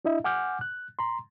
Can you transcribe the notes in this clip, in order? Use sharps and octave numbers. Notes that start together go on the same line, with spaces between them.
D4 E4 D#5 E5
F#5 G#5 D6 F6 G6
F#6
A#5 C6